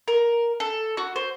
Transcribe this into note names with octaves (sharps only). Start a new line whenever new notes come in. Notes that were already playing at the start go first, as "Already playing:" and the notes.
A#4
A4
F#4
C5